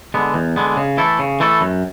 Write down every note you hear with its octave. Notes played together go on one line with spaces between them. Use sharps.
D3 G#3 B3
E2
D3 G#3 B3
C#3
E3 A3 E4 A4
C#3
E3 A3 E4 A4
F#2